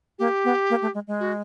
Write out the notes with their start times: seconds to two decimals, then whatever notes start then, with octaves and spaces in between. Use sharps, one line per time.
0.19 A#3 G4
0.44 B3
0.70 A#3
0.82 A3
0.94 G#3
1.07 G#3
1.20 F#4